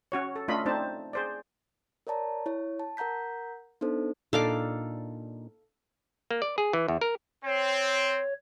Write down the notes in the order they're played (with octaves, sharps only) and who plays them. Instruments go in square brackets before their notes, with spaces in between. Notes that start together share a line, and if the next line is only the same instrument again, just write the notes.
[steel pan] C#4 F#4 C#5
A4
A3 C#4 D4 F4 D#5 B5
A3 C4 D4 D#4 C5 A5
G#4 C5 D5
[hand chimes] A#4 C#5 D5 A5 A#5
E4 C#5
A5
A#4 F#5 A#5 G6 B6
B3 D4 D#4 A4 C5
[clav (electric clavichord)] A#2 D4 D#4 [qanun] A4 F5 D6
[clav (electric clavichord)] A#3
D5
G#4
E3
E2
A#4
[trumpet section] C4 [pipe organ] C#5